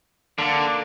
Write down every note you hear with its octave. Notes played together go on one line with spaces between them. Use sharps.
D3 A#3 D4